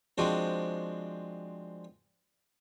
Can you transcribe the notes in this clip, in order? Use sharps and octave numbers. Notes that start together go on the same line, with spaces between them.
F3 G#3 C4 D4 F#4